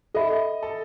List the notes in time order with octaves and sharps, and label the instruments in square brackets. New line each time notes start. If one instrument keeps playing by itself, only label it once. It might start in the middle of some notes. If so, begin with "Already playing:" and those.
[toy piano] A4 E5 B5 [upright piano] D#5
[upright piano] A4